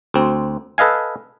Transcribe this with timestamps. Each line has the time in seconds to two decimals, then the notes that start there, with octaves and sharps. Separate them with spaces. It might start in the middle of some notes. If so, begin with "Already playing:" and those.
0.14 D2 C4
0.78 A4 B4 D#5 F5 G#5